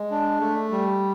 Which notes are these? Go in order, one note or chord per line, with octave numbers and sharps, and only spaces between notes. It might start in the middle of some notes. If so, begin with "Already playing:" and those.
Already playing: G#3
D4
A3
G3